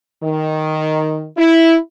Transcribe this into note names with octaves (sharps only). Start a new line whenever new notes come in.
D#3
E4